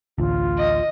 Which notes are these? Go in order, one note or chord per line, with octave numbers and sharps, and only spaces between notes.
A1 D2 F4
D#5